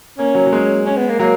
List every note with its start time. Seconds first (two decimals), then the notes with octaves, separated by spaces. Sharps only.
0.18 A#3 C#4
0.35 F#3
0.47 F#3
0.53 G#3
0.86 C#4
0.97 B3
1.09 A#3
1.19 F#3 A#3